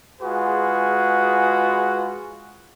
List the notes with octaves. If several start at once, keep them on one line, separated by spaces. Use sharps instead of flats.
G#3 F4 F#4 G#4 B4